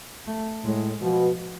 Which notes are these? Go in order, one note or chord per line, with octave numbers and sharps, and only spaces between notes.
A3
A2 G#3
B2 F3